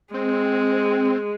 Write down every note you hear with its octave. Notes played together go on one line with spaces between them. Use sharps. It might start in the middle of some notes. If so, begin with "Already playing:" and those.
G#3 C4